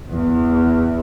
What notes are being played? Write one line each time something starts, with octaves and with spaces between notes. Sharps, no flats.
E2